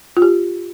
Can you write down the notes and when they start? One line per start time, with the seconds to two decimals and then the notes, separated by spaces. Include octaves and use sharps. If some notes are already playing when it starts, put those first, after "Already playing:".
0.17 F4
0.22 G4